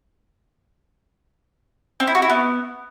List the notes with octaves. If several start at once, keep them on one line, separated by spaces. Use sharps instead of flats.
C4
E4
F#4
E4
B3